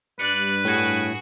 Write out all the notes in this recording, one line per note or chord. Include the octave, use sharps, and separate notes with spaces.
G2 B4 D5 F#6 C#7
A2 F#4 G#4 G#6